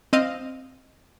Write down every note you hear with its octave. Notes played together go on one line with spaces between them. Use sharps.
C4 D#5 F5